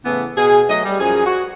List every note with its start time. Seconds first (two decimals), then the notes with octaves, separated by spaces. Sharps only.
0.05 A2 C#3 E3 B3
0.37 B2 G#4
0.69 F#3 A3 D#5
0.85 G3
1.00 F#2 F3 G#4
1.26 F#4